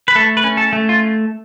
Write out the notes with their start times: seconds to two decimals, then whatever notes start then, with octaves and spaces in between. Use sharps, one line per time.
0.08 B4
0.15 A3 A4
0.37 B4
0.44 C#4
0.57 A4
0.73 A3
0.89 F4